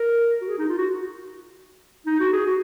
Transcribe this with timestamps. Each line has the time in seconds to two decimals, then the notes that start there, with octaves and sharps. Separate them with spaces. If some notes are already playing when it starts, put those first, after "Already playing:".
Already playing: A#4
0.41 F#4
0.48 G#4
0.58 D#4
0.69 F4
0.78 F#4
2.06 D#4
2.20 F#4
2.33 G#4
2.47 F#4